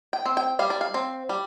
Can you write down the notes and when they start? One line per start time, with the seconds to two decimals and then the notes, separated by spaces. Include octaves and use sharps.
0.13 G5
0.26 C4
0.37 G5
0.59 G3 F5
0.70 D5
0.81 F5
0.94 C4
1.29 G3